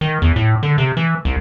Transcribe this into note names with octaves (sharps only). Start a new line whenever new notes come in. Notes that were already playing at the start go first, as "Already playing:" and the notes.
D#3
E2
A2
D3
C3
E3
C2